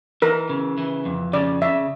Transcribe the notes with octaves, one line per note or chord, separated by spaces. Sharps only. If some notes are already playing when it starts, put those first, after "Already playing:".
E3 A#4
C#3
E3
F2
C#3 D5
C#3 E5